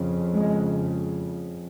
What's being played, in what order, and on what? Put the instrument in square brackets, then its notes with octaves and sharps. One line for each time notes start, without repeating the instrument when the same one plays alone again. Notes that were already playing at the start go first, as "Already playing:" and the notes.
Already playing: [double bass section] F2 C#3
G#3